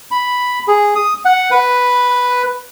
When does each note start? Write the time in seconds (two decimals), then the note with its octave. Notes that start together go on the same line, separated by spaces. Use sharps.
0.11 B5
0.68 G#4
0.95 D#6
1.25 F#5
1.51 B4